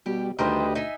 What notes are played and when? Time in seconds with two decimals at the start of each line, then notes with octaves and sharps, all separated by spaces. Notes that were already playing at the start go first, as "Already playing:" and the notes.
0.06 B2 G3 G4
0.39 D2 D#3 G3 G4 B4 C5 D#5
0.75 D#4 E5 G#5